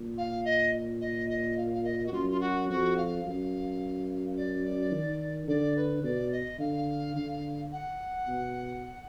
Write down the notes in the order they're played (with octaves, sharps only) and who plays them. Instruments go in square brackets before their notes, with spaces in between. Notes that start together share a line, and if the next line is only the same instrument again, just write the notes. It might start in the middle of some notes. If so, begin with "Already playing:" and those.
Already playing: [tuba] A#2
[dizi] F5
D#5
D#5
D#5
F5
F5
D#5
F#4
[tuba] F#2 [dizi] F4
[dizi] F4
F#4
[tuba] F2 [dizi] F#4
[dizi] F5
[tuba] F#2 [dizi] F5
[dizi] D5
[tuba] D#3
[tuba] D3 [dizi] D5
[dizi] B4
[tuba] B2 [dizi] D5
[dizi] D#5
[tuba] D3 [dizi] F5
[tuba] D3
[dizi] F#5
[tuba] B2